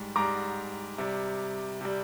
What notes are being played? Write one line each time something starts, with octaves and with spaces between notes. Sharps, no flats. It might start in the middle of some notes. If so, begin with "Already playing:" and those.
Already playing: G#2 G3
G#2 G3 A#5 D6
C3 G3
C3 G3